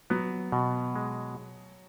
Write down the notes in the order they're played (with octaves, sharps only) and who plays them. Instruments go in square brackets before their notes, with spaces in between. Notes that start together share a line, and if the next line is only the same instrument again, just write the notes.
[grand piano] F#3 [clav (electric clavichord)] B3
[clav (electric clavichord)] B2
G#3